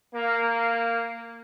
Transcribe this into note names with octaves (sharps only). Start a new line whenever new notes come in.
A#3